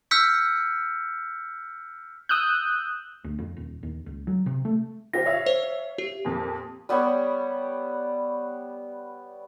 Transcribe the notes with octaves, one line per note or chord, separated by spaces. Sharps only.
E6 F6 G6 B6 C#7
D#6 E6 F#6 G6
D2
F2
D#1
D#2
C#2
F#3
C3
A3
F4 G4 C5 A#6
C#5 E5 F5
C5
G4
F2 A#2
G3 B3 G4 C#5